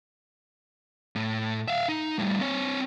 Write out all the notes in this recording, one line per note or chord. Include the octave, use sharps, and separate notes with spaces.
A2
E5 F5
D#4
A2 G3
C4 C#5